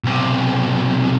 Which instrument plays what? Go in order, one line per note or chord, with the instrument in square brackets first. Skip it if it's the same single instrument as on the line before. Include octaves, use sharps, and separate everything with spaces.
[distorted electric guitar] B1 C3